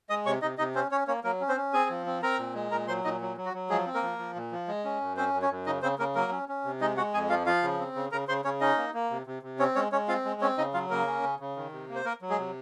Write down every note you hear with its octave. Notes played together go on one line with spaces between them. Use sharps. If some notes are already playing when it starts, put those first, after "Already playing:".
G#3 D#5 D#6
C3 C#5 C#6
C3 D#4 D#5
C3 D#4 D#5
C4 C#4 C5
C#4 C#5
A#3 C#4 C#5
F#3 A#3 A#4
C#4
C4 C5
C#4
C4 G#4 G#5
F3
C4
C4 A#4 A#5
A#2
G#3
A#2 A#4 A#5
F#3 C5 C6
A#2 D#4 D#5
F#3
F#3
F#4
F#3
F3 G#3 G#4
C4
A#3 A#4
F3
F3
A#2
F3
G#3
C#4
F#2
C4 C#4 C5
F#2
C#4 C#5
F#2
C#3 D#4 D#5
C#3 C4 C5
C#3 A#3 A#4
F#3 A#3 A#4
C#4
C#4
C3
G#3 D#4 D#5
G#3 F#4 F#5
F2 G#4 G#5
F3 F4 F5
F3 F4 F5
C#3
C4
C#3
C#3 A#4 A#5
C#3 C5 C6
C#3 C#4 C#5
C#4 D#4 D#5
A#3
A#3
C3
C3
C3
C4 C#4 C#5
G#3 C#4 C#5
G#3 C#4 C#5
C4 F4 F5
G#3
C4 C#4 C#5
C#3 D#4 D#5
F#3 F4 F5
C#3 A#3 A#4
C#4
C#3
C#3
D#3
C3
A#3
C5
A#3 A#4
F#3
G#3 G#4
C3